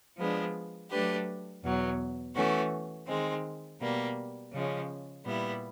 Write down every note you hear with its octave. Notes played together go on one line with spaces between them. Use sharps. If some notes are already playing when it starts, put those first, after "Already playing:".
F3 G#3 B3 D4
F#3 A3 D4 G4 B4
E2 B2 F#3
E3 A3 C#4 F#4
D#3 G#3 C4
B2 G3 A#3
C#3 F3 G#3 C#4
A#2 G3 B3 E4